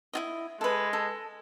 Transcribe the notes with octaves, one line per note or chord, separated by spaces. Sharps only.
E4 F4 D#5
G#3 A4 B4
A4